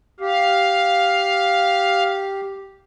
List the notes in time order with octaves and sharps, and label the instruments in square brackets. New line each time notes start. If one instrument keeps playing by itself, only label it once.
[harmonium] G4 [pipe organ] F5